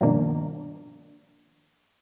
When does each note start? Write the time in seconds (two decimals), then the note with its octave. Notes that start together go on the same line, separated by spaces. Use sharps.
0.01 G2 B2 D#3 F3 A#3 D4